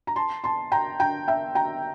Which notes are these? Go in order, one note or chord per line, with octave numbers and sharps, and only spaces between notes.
A#5
A5 C6
A5 C6
G5 A#5
G5 A#5
E5 G5
G5 A#5